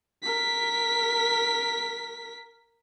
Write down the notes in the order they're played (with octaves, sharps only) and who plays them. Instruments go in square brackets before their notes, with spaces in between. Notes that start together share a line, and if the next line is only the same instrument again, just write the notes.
[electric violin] A#4 B6